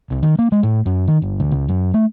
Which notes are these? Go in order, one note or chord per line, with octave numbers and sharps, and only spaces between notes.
C2
D#3
A#3
G#3
A2
F#2
D#3
G1
D2
C#2
F#2
A3